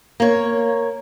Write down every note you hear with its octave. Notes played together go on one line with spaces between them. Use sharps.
A#3 C#5